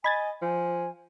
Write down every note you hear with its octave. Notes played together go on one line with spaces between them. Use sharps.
D#5 G#5 B5 G#6 A6
F3 G#5